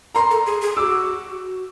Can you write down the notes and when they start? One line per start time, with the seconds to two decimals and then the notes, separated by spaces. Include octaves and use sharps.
0.15 A#4 A#5 C6
0.31 A4
0.46 G#4
0.62 G#4
0.77 F#4 D6 E6